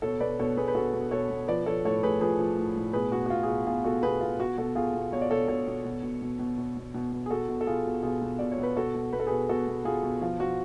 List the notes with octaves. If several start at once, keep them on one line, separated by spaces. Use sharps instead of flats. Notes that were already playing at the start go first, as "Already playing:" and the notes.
B2 A4 C#5
B2 B4 D5
B2 A4 C#5
B2 G#4 B4
B4
B2 F#4 A4
B2
B2 A4 C#5
B2
F3 B4 D5
F3 A4 C#5
A2 A4 C#5
A2 G#4 B4
F3 G#4 B4
F3
A2
A2
B2 G#4 B4
B2 F#4
F#4
B2 F4
G#4
B2 F#4
B2 F4 G#4
B2 F#4 A4
B2 G#4 B4
B2 F4
B2 F#4
B2 F#4 A4
B2 F4 G#4
B2
B2 C#5
D5
B2 A4 C#5
B2 A4 C#5
B2
B2
B2
B2
B2
B2
B2
B2
B2
G#4
B2 F#4 A4
B2
A4
B2 F4 G#4
B2
B2 F4 G#4
B2
B2 D5
C#5
B2
B4
B2 F#4 A4
B2
B2 B4
A4
B2 G#4 B4
B2 F#4 A4
B2
B2 F4 G#4
B2
F3 F4
F3 F#4